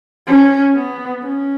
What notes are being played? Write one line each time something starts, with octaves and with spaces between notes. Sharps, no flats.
C#4
B3
C#4